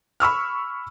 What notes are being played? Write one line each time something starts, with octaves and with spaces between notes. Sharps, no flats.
B5 C#6 E6 F6